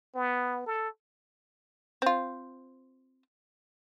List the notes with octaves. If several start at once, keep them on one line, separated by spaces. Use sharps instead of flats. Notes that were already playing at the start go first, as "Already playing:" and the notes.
B3
A4
C4 F4